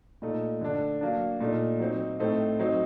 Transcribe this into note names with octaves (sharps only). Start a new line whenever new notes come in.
A#2 A3 D#4
D3 A3 D4
F#3 A#3 D4
A#2 A3 D#4
F#3 C4 D#4
A2 A3 C4 D#4
F#3 C4 D#4